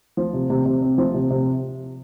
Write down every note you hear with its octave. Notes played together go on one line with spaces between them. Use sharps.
F3
C3
C3
C3
C4
F3
C3
C3